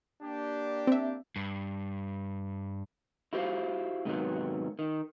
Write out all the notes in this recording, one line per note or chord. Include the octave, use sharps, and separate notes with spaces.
A#3 D4 G4
C4 E5
G2
E4 F#4 G4 C5 D#5 F5
G#2 C3 D#3 E3 F#3 B3
D#3